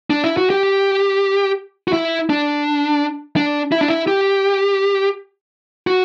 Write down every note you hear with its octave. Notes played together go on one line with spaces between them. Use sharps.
D4
E4
F#4
G4
F#4
E4
D4
D4
E4
D4
E4
G4
F#4